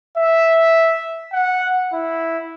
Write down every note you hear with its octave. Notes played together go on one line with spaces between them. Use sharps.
E5
F#5
E4